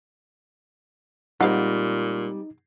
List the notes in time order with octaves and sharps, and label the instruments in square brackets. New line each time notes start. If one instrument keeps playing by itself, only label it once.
[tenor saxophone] A#2 [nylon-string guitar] G3 G#3 C4 [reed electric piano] D#4 [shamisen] C5 F5 F#5